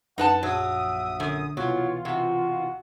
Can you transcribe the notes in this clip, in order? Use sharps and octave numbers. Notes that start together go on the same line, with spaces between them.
F#2 D#4 B4 F#5 A5
A#1 F#3 E5 D#6
F#2 D3
C2 B2 E3 F#3 F4 C#5
C3 F#4